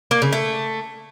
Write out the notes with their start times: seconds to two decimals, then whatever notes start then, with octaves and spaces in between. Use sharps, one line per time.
0.11 A#3
0.22 C#3
0.32 A3